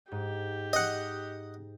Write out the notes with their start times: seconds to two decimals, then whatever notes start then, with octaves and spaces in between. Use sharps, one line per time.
0.12 G#2 G4
0.73 D#5 F#5